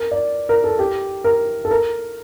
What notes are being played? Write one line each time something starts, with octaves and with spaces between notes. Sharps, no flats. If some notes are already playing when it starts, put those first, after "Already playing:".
Already playing: A#4
D5
A#4
A4
G4
A#4
A4
A#4